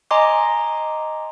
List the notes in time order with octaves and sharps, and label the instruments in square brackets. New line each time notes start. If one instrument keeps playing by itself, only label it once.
[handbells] D#5 G#5 A#5 C6 D6